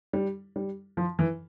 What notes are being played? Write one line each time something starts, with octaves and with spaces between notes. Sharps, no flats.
G3
G3
F3
E3